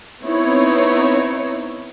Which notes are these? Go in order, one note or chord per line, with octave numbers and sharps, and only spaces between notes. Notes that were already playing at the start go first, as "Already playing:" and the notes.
B3 C4 D#4 E4 C#5